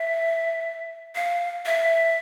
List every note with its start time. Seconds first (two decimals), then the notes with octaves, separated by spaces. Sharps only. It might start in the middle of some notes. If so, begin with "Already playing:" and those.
Already playing: E5
1.15 F5
1.66 E5